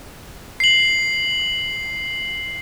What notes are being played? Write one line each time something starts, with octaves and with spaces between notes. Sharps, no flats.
C7 F#7